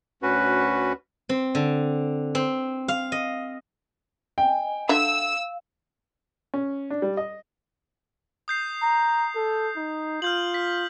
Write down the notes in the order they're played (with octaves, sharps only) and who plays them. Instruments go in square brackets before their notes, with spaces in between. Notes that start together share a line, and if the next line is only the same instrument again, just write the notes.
[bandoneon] D2 C#4 F#4 B4
[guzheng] C4
D3
C4
F5
D#5
[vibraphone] D#5 G#5 [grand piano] G5
[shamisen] D3 D4 E5 [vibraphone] F5 [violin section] E6
[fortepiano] C#4
D4
G3
D#5
[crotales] D#6 G6 C7
[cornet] A#5
A4
D#4
[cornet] F4 [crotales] F6 G6 F#7
[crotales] B6